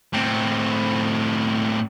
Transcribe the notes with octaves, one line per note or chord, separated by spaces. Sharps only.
A2 C4